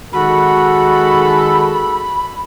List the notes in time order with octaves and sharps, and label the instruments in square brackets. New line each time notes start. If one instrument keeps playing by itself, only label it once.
[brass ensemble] D#3 G#3 A4 [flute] F#4 [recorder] B5